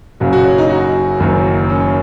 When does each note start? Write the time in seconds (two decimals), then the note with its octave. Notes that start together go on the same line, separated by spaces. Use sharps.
0.20 F#1 F#2 C#3 F#4
0.33 F#4
0.45 C#5
0.58 D#4
0.70 F#4
1.20 F#1 F#2 D#3 F#3
1.70 C#4